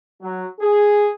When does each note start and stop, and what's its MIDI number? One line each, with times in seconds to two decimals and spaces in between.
0.22 0.47 54
0.59 1.09 68